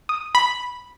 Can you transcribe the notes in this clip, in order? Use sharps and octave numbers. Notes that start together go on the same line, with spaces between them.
D#6
B5